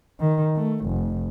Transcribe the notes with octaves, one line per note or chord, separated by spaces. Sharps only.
D#3
A3
F1